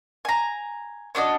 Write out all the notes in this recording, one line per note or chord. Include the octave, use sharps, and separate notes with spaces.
G#5 A#5
C#4 D4 F#4 D#5